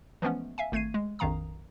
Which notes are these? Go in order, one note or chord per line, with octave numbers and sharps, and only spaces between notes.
E3 F3 G#3 A3 B3 C#4
E5 F5 G#5
G#1 A3 G#6 C7 D#7
G#3
A#1 F2 D#3 F5 A#5 D#6